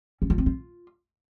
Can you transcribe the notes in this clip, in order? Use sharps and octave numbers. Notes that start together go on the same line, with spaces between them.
C#4
F4
C4
F4